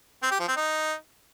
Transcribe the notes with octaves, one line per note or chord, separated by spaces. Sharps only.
C4
G4
F3
C4
D#4